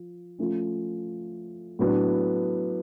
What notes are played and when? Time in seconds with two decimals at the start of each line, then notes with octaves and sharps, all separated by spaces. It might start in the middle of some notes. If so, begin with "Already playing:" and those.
Already playing: F3
0.39 F3 A3 C#4
1.79 A2 F#3 B3 D4